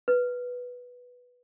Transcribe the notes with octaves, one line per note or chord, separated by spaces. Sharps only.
B4